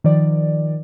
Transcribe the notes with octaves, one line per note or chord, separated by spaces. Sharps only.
D#3 F3 D5